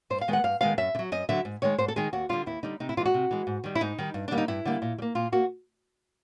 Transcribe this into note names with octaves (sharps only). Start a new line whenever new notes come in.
G2 C5
F5
D#3 G#3 B3
F#5
G2 F5
D#3 G#3 B3 F5
F#2 E5
D3
F#3
F#2 D#5
D3 F#3 E5
G#2
D#3 G#3 C#5
G#2 C5
A4
D#3 G#3 G#4
D#2 F#4
D3 G3 F4
D#2 E4
D3 G3 D#4
C3 D#4
E4
E3 G#3 F4
F#4
C3
E3 G#3
G#2
D#3 G3
E4
G#2 D#4
D#3 G3
G2
D3 G3 A#3 D4
D#4
G2 E4
D3 G3 A#3
A#2
G3
A#3
A#2 F4
A#3 F#4